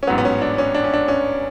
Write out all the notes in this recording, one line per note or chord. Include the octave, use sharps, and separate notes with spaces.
C#4
A1 G#2 F#3 B3
B3
C#4
D4
C#4
D4
C#4
D4
C#4